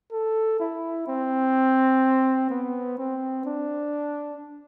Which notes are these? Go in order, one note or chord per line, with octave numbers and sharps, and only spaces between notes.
A4
E4
C4
B3
C4
D4